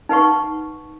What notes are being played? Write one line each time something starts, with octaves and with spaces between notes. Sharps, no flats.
D#4 B4 F#5 C#6